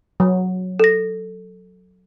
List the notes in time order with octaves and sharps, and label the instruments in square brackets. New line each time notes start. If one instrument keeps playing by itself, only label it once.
[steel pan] F#3
[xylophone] A4 A#6